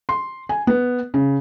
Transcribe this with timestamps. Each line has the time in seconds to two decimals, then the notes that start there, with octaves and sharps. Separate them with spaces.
0.09 C6
0.49 G#5
0.67 B3
1.14 C#3